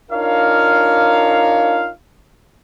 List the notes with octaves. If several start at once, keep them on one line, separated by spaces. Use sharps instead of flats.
D4 D#4 F4 A#4 C#5 F5